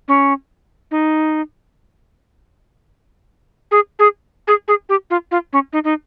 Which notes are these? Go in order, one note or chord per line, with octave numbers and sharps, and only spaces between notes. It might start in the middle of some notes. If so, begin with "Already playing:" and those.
C#4
D#4
G#4
G#4
G#4
G#4
G4
F4
F4
C#4
D#4
D#4